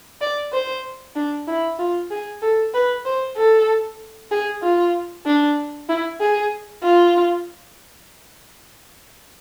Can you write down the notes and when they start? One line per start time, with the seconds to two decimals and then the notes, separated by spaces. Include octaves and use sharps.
0.21 D5
0.53 C5
1.16 D4
1.47 E4
1.79 F4
2.11 G#4
2.42 A4
2.74 B4
3.06 C5
3.37 A4
4.32 G#4
4.63 F4
5.26 D4
5.89 E4
6.21 G#4
6.83 F4